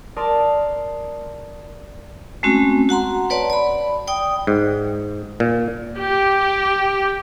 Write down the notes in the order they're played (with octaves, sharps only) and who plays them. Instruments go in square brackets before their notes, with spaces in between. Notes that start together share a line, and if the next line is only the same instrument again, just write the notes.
[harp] A#4 D5 A5 C6 D#6
[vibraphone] G#3 A3 C4 C#4 F#4
F#4 F#5 A#5 C6
B4 C#5 D5 F#5 A5 C6
D5 B5
D5 G5 D#6
[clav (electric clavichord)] G#2
A#2
[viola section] G4